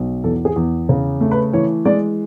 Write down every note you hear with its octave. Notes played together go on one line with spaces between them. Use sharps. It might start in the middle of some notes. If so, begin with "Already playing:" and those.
Already playing: B1
E2 A4
G#4
E2
C#3
A3
B4
E3 C#5
G#3 D5